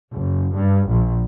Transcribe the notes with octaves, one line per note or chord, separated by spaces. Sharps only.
F#1
G2
A#1